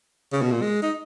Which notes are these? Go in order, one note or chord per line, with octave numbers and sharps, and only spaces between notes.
C#3
B2
A#2
G#3
D#4